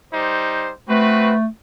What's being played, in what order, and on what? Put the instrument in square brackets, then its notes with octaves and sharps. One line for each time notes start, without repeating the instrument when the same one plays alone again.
[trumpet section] G3 D#4 C5
[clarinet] A3 [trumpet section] C4 F#4 B4